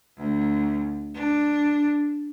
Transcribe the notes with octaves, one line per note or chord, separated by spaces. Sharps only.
D2
D4